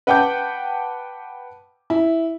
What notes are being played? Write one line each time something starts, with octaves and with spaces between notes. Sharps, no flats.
B4 F#5 G5 A5 D6 G6
E4